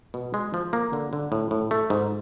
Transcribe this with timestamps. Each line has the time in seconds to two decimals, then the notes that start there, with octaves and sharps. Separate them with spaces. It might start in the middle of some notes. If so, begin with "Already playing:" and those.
0.14 B2
0.34 G#3
0.54 F3
0.73 A#3
0.93 D3
1.13 D3
1.32 A2
1.51 A2
1.71 A3
1.90 G#2